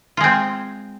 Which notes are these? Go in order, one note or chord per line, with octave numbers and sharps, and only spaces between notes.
G#3 C4 F4